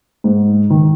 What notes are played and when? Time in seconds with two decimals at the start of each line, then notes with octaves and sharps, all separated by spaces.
0.24 G#2
0.70 D#3